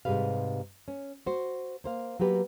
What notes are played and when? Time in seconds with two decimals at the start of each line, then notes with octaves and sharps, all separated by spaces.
0.05 G#2 C3 G3 G#4 B4 F5
0.88 C#4
1.26 F#4 C5
1.84 A#3 C5 F5
2.19 F#3 A#3 B3 G4 B4